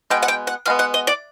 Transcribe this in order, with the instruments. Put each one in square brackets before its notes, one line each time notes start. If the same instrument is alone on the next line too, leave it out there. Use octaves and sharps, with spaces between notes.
[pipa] B2 G#3 B3 [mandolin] G5
[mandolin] F#5
G5
F#5
[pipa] B2 G#3 B3 [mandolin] F5
[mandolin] F#5
D#5
D5